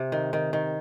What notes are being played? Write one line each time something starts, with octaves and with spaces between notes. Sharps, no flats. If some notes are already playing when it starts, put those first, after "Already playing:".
Already playing: C3
D#3
D#3
D#3